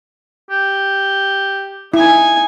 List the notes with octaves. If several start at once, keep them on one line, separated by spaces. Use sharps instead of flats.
G4
D#4 E4 G#5